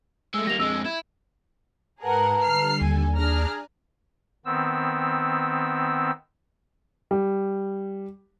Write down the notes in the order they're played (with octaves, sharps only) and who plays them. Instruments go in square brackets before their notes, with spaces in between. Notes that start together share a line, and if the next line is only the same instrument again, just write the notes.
[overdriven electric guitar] G#3 A3 [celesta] E6
[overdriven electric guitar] G3 A#3 [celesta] A#6 F7
[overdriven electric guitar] F2 G#3 [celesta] E6
[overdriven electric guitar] E4 [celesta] G#6
[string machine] G#2 [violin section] G#4 A#4 F#5 [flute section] B4 A5 A#5
[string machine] D3 G3 A4 [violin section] F6 C7
[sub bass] D#2 [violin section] G#5
[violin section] D4 A#5 F6 [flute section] G#4 [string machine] D5 G#5 F#6
[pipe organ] D#3 B3 C4 E6
[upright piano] G3